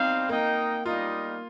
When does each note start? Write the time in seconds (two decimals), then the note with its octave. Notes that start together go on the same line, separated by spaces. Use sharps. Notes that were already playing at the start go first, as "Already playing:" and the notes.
Already playing: G3 C4 D#4 C5 F5
0.29 A#3 D#4 A#4 D#5 G5
0.86 G3 A#3 D#4 F4 A#4 D#5